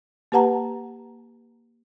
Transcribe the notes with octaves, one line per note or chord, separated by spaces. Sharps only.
A#3 G4 B4 F#5 A5 A#5